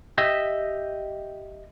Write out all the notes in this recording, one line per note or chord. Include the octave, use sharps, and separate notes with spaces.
G4 D#5 E5